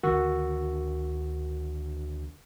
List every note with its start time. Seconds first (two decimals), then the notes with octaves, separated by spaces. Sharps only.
0.03 D2 D3 D#3 F#4 A#4 C#6 E6